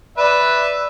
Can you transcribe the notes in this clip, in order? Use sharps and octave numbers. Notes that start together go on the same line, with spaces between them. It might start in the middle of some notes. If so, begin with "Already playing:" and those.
B4 D5 E5